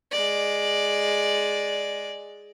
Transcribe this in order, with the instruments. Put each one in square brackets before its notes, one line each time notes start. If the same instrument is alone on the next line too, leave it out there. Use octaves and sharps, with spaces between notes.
[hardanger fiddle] G#3 D5